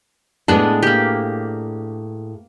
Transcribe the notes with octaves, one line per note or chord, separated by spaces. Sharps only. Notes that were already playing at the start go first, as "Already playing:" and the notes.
A2 G#3 B3 D4 G#4 A5
A#3 G4